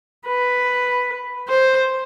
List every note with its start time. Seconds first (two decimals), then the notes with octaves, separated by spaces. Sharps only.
0.27 B4
1.49 C5